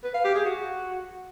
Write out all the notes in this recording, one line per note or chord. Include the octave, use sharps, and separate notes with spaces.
B4
F5
G4
G#4
F#4